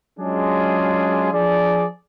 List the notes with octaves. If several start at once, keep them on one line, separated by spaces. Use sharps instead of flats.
F#3 G#3 C#4 D4 F4 G#4
F3 D4 G#4 D5